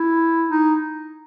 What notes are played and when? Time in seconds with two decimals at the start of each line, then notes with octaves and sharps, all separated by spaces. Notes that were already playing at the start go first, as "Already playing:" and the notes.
Already playing: E4
0.50 D#4